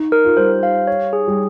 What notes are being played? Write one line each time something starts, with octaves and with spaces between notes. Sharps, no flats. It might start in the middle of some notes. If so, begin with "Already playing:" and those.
Already playing: D#4
A#4
F4
G3 C5
F5
C#5
G#4
G3